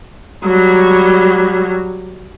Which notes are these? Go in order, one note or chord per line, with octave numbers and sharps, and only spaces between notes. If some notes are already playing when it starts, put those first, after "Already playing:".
F#3 G3